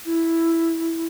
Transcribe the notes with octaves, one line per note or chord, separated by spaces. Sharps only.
E4